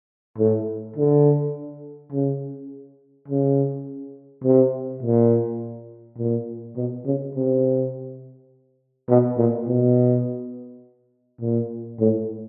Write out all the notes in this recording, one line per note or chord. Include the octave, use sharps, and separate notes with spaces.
A2
D3
C#3
C#3
C3
A#2
A#2
B2
C#3
C3
B2
A#2
B2
A#2
A2